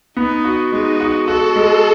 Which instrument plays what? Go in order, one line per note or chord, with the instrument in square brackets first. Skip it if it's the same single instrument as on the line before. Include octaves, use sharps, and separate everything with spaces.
[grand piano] B3 [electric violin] D#4
[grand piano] F#4
[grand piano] G#3 [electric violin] D#4
[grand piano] F#4
[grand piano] F#4 [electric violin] A4
[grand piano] G#3